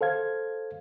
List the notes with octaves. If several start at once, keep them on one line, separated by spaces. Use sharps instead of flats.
A4 C5 F5 G#6